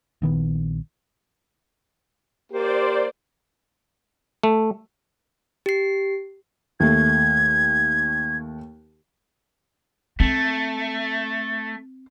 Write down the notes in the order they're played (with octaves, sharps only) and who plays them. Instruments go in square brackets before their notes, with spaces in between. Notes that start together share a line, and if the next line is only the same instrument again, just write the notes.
[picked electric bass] A#1 D#3 B3
[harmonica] A#3 [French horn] G4 [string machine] C5 D5
[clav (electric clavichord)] A3
[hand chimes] G4 C7
[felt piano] D#2 A3 [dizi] G#6
[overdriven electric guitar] A3 [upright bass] C4